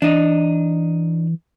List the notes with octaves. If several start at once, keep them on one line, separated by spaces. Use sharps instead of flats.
E3 D4 D#4